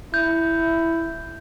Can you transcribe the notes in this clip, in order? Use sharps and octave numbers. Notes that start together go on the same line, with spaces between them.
E4 G6